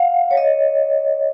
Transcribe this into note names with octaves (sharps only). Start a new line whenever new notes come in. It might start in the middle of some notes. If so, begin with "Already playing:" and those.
Already playing: F5 F#5
C#5
D#5